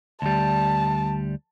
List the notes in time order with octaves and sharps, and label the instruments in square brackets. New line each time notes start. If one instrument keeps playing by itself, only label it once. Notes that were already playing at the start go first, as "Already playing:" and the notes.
[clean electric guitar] D2 G3 [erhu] A5